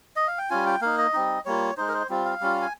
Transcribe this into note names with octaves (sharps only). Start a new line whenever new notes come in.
D#5
F5
G5
G3 C#4 F4 G#5
G5
A#3 D#4 F5
D#5
G3 C4 D#4
G3 A#3 F4 C#5
G#3 D#4 C5
A#4
C5
G3 C4 F4
F5
G3 C#4 F4
G#5